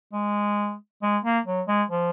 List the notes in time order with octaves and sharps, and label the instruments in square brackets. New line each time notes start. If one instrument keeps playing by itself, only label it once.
[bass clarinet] G#3
G#3
A#3
F#3
G#3
F3